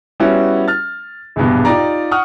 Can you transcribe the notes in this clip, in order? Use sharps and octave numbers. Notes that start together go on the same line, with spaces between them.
G3 B3 C#4 E4 F#4
F6 A6
A#1 E2 G2 B2
D#4 F4 G4 D5 A#5
F#5 C#6 D#6 F6